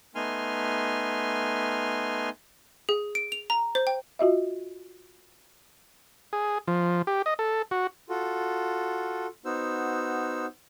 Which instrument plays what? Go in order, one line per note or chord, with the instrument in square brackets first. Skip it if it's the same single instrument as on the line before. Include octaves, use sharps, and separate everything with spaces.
[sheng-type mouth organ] A3 B3 D#4 G#5 C6 F6
[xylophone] G#4
D7
F7
A#5
C5
G5
[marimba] F4 F#4 D#5 E5
[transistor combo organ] G#4
F3
G4
D#5
A4
F#4
[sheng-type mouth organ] F4 F#4 A4
B3 D#4 F#4 C5 E6